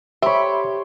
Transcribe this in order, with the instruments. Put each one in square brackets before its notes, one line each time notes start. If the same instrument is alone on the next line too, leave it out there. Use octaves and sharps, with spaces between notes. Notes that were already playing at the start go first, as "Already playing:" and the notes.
[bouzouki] G4 [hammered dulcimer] C5 C#5 [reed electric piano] E5 B5